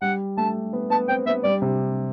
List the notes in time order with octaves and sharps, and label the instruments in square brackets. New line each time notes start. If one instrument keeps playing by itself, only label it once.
[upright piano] G3 [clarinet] F#5
[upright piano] A3 [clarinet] A5
[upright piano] B3
[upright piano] B3 [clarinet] A5
[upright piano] C4 [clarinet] G5
[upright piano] B3 [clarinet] E5
[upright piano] G3 [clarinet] D5
[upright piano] C3